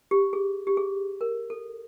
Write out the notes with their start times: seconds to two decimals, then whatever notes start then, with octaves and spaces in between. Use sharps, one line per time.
0.11 G4
0.33 G#4
0.67 G4
0.77 G#4
1.21 A#4
1.50 A4